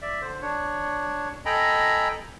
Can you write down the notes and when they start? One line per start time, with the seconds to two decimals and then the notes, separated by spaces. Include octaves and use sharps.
0.02 D5 E5
0.21 D3 C5
0.42 D4 C#5
1.46 A4 D#5 G5 G#5 A#5 B5